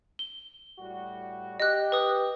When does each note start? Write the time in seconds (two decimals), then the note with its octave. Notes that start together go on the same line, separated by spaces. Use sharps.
0.19 G7
0.79 A2 G3 F#4
1.60 G4 D#5 F#6
1.92 B4 D#6